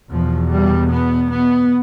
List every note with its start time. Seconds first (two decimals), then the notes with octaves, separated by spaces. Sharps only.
0.10 E2 B2 F3
0.51 G3
0.91 B3
1.31 B3